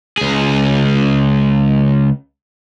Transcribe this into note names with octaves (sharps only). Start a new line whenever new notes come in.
C#2 G#4